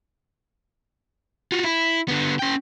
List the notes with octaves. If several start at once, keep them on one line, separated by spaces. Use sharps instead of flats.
F4 F#4
E4
D3 B3
C#4 G5